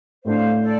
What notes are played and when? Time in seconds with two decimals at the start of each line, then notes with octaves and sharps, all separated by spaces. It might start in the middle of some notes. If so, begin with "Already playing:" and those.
0.25 A2 A3 D4 C5 F5
0.62 A4 D5